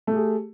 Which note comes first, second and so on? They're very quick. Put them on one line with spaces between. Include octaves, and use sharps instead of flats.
A3 G4 G#4